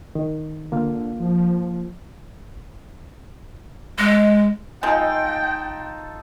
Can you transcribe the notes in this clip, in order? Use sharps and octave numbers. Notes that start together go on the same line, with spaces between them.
D#3
D3 A#3 F4 F5
F3
G#3
G#3 D#4 F4 A4 G5